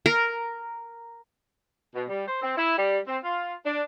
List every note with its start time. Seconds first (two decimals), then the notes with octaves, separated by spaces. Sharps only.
0.06 A#4
1.95 B2
2.09 G3
2.27 C5
2.42 C4
2.57 E4
2.78 G3
3.07 C4
3.24 F4
3.65 D4